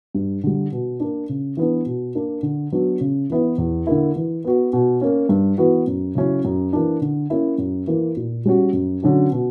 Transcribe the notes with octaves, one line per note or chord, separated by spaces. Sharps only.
G2
D3 G3
B2
A#3 D4
C#3
E3 B3 D4
B2
A#3 D4
D3
F#3 B3 D4
C#3
E3 B3 E4
E2
D3 A#3 E4
E3
B3 F#4
B2
A#3 C#4
G2
E3 B3 F#4
F#2
C#3 F#3 C#4 E4
F#2
E3 A#3 D4
D3
A#3 C#4 E4
F#2
E3 A#3
A#2
G3 C#4 F#4
F#2
D3 F#3 C#4 F#4
B2